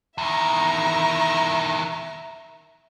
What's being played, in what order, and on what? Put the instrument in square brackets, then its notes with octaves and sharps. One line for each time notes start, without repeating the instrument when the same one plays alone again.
[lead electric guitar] E2 D#3 [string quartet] E5 A#5